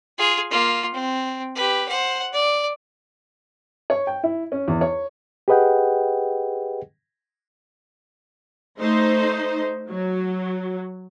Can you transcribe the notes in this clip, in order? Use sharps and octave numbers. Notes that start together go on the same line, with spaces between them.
F4 G#4
A#3 F4
C4
G4 B4
C5 F#5
D5
C#5
G5
E4
C#4
E2
C#5
G4 G#4 B4 D#5 F#5 G5
A3 D#4 C5
F#3